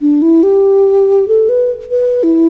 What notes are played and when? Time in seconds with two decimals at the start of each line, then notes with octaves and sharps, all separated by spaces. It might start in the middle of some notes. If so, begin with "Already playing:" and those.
0.01 D4
0.22 E4
0.43 G4
1.28 A4
1.49 B4
1.91 B4
2.23 E4